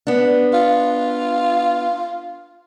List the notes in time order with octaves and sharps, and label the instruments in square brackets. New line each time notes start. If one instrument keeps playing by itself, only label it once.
[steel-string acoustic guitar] B3 D4
[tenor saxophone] F4